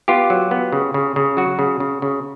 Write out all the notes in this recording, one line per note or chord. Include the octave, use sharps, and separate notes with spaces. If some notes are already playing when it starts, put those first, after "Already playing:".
B3 F4 G4
F#3
B3
C#3
C#3
C#3
F#3 F#4
C#3
C#3
C#3